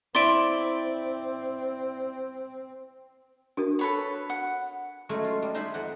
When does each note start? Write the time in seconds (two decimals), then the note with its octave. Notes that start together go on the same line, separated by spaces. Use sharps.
0.15 C4 E4 D5 C6 D7
3.57 D4 F#4 A#4
3.79 A4 B4 C#5
4.30 F#5
5.09 F#3 G#3 A3 C#4
5.24 F4
5.42 G3
5.54 D#4 C5 E5 G#5 B5
5.74 F2 F#5